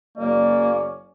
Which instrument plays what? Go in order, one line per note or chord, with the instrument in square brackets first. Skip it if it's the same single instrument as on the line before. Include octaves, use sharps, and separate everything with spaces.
[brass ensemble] F#1 C#4 D5 [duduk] A#3